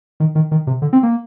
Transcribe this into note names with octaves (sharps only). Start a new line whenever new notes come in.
D#3
D#3
D#3
C3
D3
C4
A#3